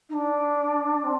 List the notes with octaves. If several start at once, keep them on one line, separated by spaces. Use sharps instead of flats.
D#4
D4
C4